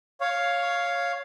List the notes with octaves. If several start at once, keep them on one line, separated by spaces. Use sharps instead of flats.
C#5 F5